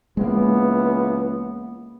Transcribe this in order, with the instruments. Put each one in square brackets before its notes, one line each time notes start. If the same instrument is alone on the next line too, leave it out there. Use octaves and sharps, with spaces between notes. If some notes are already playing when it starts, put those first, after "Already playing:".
[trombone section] C#2 E3 B3 [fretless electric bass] G#3 A#3